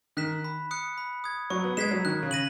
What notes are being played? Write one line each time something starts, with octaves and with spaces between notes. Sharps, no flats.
D#3 F#6 B6 E7
B5
D#6 F#6 C#7
B5
D#6 G#6
F#3 C#6
B3
G#3 G#6 B6 E7
F#3
D#3 F#6
C#3
A#6 D#7 F#7